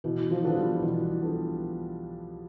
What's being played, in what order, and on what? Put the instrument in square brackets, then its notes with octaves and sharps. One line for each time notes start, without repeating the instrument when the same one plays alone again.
[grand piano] B2 [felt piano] E3
[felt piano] F3
[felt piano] F3 [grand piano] B3 D4 A4
[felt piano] G3
[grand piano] B2 [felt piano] E3
[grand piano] B3 D4 A4